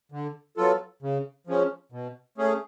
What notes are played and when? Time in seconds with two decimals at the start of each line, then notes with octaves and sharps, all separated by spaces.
0.12 D3
0.57 F#3 B3 F4 A4
1.02 C#3
1.47 F3 G#3 C#4
1.92 B2
2.38 A3 C#4 G#4